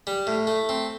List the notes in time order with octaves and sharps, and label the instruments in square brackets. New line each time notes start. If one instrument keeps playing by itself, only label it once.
[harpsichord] G3
A2
A3
C4